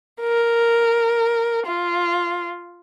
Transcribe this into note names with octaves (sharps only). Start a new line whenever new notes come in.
A#4
F4